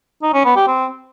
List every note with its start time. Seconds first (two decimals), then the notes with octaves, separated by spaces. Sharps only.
0.22 D#4
0.34 C#4
0.45 B3
0.56 G4
0.67 C4